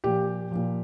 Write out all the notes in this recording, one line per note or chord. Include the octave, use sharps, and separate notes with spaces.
A#2 F3 G4
A#2 F3